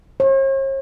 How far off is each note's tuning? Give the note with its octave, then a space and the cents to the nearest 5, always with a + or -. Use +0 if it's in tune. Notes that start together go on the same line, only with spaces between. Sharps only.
C#5 -45